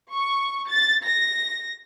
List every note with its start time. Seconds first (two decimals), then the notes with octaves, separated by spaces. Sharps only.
0.12 C#6
0.70 A6
1.06 A#6